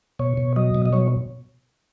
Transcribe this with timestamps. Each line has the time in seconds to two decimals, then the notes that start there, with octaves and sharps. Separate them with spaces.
0.19 B2 C#5
0.37 B2
0.56 F#3 D#5
0.75 B2
0.86 D#5
0.93 F#3 C#5